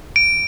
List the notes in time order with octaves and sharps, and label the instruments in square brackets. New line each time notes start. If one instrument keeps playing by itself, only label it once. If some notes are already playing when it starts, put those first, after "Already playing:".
[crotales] D7